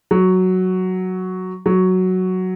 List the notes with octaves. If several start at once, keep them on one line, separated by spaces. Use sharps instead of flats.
F#3
F#3